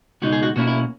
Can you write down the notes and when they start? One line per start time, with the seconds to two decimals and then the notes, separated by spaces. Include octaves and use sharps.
0.22 C#2 B2 G#3 D#4 F#4
0.33 G#4
0.43 F#4
0.56 B2 A#3 C#4 E4 F#4
0.67 E4